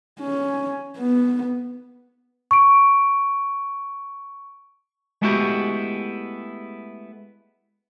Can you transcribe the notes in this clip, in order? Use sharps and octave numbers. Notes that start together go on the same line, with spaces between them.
C#4
B3
C#6 D7
G#3 A3 B3 E4 F#4 G4